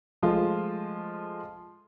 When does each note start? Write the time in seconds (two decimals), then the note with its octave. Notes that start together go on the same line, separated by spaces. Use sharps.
0.22 F3 G#3 A3 F4